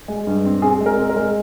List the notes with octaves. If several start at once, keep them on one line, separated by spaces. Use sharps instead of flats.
G#3
G2
C4
C4 G#4
G#3
A#4
C4
A#4
G#3